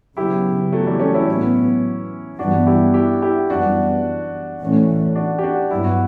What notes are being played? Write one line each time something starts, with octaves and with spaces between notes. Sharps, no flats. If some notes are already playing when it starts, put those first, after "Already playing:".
C#3 F#3 B3 E4 G4
F#3 A3
E3 G3
A3 C#4
C#4 E4
A2 F#3 B3
G2 E3 G3 B3 D4 F#4
E4 G4
E4 G4
E4 G4
F#2 E3 G3 B3 D4 F#4
A2 E3 A3 C#4
D4 F#4
G4
D4 F#4
G2 F#3 B3 E4
F#4